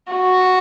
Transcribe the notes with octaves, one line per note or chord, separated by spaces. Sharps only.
F#4